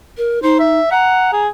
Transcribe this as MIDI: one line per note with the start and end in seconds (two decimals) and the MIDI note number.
0.17 0.39 70
0.43 0.79 63
0.43 0.55 72
0.59 0.87 76
0.91 1.31 78
0.91 1.42 82
1.32 1.48 68